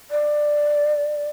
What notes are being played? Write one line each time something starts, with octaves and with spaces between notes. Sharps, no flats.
D5